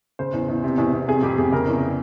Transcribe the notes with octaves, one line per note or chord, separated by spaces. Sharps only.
C#3 C5
E2
E2
C3
E2
E2
C3 G#4
F2 G4
F2 G#4
C#3 A#4
E2